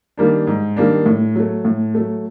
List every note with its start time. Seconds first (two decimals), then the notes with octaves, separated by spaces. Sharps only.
0.17 D#3 G3 A#3 D4
0.47 G#2
0.77 D#3 G3 A#3 D4
1.06 A2
1.36 F#3 A3
1.65 A2
1.95 F#3 A3